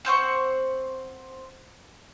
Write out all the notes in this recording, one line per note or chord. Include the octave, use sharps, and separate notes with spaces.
C4 C5 F#5 C#6